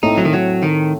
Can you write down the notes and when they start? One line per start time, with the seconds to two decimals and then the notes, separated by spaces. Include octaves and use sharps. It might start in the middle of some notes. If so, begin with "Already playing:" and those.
0.03 A2 A3 C4 D#4
0.17 F#3
0.25 D#3
0.33 F#3
0.63 D#3